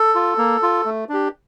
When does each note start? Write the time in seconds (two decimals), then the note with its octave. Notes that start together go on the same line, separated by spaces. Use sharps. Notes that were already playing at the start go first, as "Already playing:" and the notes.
Already playing: A4
0.15 F4
0.38 A#3
0.63 F4
0.85 A3
1.09 D4 G4